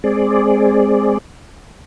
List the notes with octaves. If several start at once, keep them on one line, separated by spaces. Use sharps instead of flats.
G#3 C4 G#4 D5